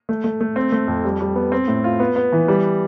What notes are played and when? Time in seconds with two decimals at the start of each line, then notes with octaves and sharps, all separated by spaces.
0.09 A3
0.24 A3
0.41 A3
0.56 C4
0.72 A3
0.88 F2
1.05 G3
1.21 G3
1.36 B3
1.52 C4
1.68 A2
1.84 F4
2.00 B3
2.16 B3
2.32 E3
2.48 G3